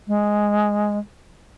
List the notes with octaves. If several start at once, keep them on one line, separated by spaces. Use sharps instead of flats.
G#3